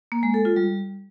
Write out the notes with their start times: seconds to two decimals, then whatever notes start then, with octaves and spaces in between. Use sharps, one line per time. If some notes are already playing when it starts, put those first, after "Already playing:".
0.12 A#3
0.23 G#3
0.34 A4
0.45 F4
0.56 G3